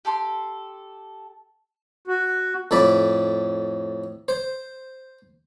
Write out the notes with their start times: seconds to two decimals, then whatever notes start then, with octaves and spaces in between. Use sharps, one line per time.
0.05 G4 A4 C6
2.07 F#4
2.71 F2 A2 D5 B5
4.28 C5